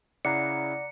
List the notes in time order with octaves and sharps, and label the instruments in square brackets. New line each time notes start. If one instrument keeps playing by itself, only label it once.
[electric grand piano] C#3 E4 C7 [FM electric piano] D5 F#5 A#5 [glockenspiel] C#7